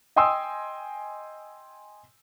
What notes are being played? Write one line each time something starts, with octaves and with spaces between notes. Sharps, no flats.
D#5 G5 G#5 C6 D#6 E6